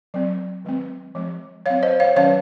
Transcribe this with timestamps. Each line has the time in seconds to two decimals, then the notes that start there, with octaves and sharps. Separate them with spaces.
0.14 F#3 C4
0.65 D#3 G#3 C4
1.15 F3 G#3 C4
1.66 F#3 C4 C#5 F5
1.83 C5 D#5
2.00 C#5 F5
2.16 D#3 F#3 C#4 C#5 F5